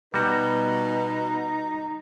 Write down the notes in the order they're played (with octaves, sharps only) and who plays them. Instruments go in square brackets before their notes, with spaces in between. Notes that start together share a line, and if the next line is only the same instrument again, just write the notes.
[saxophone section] B2 [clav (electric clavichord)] G3 F#4 [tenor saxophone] D#4 [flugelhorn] B4